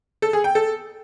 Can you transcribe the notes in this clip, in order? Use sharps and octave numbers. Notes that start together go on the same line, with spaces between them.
A4
G#4
G5
A4